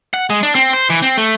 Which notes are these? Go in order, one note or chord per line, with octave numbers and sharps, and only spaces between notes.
F#5
G#3
D4
C4
C5
E3
C4
A3